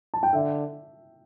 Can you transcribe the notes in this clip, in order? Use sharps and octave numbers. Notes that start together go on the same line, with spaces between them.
A5
G5
D3 E5